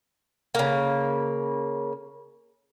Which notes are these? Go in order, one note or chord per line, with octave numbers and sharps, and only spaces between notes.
C#3 A#3